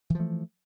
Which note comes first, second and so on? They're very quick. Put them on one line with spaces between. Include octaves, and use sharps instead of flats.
E3 F3 A3